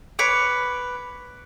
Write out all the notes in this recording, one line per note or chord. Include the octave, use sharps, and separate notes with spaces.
B4 C#5 D6